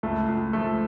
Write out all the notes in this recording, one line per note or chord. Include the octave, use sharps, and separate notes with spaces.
C#2 A3
C#2
F3 A3